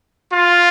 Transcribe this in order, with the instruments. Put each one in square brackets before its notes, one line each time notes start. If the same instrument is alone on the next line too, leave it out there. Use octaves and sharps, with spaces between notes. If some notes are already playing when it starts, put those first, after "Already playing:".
[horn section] F4